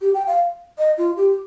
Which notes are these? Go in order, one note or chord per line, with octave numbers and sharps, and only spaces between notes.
G4
G5
F5
D#5
F4
G4